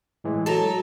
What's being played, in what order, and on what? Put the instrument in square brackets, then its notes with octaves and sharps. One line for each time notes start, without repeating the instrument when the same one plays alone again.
[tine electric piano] A2 E3 G#3
[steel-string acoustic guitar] F#3 A4 [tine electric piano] A5 A#5